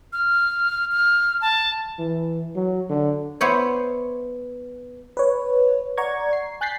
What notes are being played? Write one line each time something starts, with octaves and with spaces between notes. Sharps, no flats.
F6
F6
A5
E3
F#3
D3
B3 E4 C5 C#5
B4 C#5
D5 F#5 A#5 C#6 G#6
C7
G#5 F#6 G6 A6 B6 C7